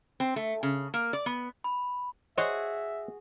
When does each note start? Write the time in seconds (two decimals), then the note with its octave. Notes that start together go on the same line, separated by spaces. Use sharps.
0.20 C4
0.36 A3
0.63 C#3
0.94 A#3
1.13 D5
1.26 B3
1.64 B5
2.38 F#4 G#4 C5 C#5 D#5 E5